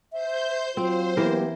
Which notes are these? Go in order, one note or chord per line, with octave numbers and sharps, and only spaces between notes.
C5 E5 G6
F#3 C4 F4 C5
E3 A#3 B3 G4 A#4